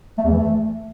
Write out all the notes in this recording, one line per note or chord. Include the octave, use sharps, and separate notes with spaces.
A3
E2
E3
A3